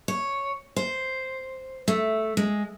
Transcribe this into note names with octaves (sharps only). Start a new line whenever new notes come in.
C#5
C5
A3
G#3